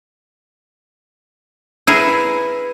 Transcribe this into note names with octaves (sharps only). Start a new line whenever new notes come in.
E4 G#4 A#4 B4